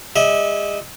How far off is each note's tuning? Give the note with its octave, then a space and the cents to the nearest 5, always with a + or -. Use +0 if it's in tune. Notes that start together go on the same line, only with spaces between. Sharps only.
G#3 -40 E5 -35